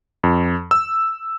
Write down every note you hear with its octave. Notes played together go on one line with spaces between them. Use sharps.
F2
E6